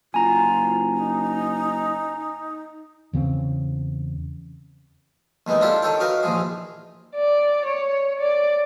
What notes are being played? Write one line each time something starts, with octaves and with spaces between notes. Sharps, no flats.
F#1 F4 G#5 A#5
D#4
E2 C#3 C4
D#2 E3 G#3 B3 D#4
D4 E4 F4 G4 A4
D#3 A4 C#5 G5
D#4 F#4 A#4 B4 F5
A#1 D#2 E3 F3 G#4
D5
C#5
D5